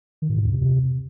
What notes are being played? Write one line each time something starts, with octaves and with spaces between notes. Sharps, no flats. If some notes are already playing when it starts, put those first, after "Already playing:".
D#3
A2
G#2
E2
C3